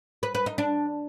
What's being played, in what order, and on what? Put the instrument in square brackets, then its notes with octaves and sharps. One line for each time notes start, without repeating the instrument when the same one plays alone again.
[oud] B4
B4
D#4
D4